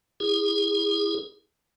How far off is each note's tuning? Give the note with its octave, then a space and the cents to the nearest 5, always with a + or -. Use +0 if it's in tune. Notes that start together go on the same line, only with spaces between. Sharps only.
E4 +0 G#4 -25